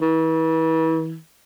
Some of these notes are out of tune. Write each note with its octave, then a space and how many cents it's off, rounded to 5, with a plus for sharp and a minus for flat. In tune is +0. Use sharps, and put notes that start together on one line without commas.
E3 -35